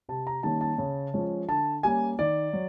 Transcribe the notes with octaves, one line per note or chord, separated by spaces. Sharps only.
C3 A5
A#5
D#3 G3 A#3 C#4 A5
A5
C#3
F3 G#3 C#4
D3 A5
G3 A#3 C#4 G#5
D#3 D5
F#3